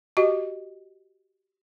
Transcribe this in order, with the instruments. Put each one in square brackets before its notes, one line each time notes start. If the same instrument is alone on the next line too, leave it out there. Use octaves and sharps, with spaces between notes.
[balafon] F#4 G4 D#5